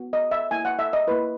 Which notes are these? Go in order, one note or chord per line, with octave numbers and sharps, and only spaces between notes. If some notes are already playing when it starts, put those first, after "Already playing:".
Already playing: B3 F#4
D#5
E5
A#3 E4 G#5
F#5
E5
D#5
A#3 E4 B4